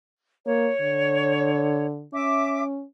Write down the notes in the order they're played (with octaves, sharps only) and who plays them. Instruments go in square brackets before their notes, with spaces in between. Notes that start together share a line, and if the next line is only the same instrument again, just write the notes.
[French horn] A#3 [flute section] C#5
[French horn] D3
[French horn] C#4 [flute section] E5 D6